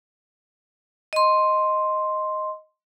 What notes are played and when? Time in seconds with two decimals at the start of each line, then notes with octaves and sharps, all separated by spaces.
1.13 D#5 C6